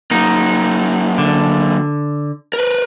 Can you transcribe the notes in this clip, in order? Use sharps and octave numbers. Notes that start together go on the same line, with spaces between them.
F#3 A#3 D#4
D3
A#4 B4